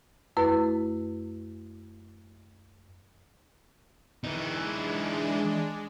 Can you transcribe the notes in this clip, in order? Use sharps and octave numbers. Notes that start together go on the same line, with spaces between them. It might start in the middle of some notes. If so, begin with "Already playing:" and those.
F#2 A3 E4 B4
E3 G#3 D4 D#4